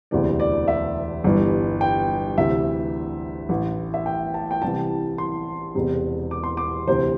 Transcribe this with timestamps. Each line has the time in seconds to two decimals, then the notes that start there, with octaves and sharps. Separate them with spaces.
0.11 E1 D2 C3 E3 D5
0.40 D5
0.68 E5
1.24 G1 G2 E3
1.81 G5
2.37 D2 C3 E3 E5
3.49 A1 A2 E3
3.94 E5
4.06 G5
4.34 A5
4.51 G5
4.62 C2 C3 E3 A5
5.18 C6
5.75 E1 E2 C3
6.31 D6
6.44 C6
6.57 D6
6.87 D2 C3 E3 C5